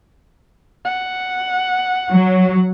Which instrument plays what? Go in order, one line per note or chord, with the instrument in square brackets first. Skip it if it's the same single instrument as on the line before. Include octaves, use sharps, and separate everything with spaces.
[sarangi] F#5
[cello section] F#3